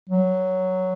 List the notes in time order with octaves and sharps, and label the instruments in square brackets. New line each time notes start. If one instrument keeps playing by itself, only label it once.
[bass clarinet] F#3